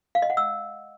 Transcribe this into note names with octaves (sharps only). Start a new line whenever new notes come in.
F5
D#5
F#5
E6